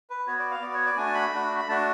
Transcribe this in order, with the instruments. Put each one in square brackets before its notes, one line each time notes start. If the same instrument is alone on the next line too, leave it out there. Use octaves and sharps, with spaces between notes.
[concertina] B4
B3 F#4 C#5
D5
F5
B3 F#4 D5
C#5
D5
A3 D4 F#4 G#5
A5
B5
A3 D4 F#4
B5
A3 D4 F#4 A5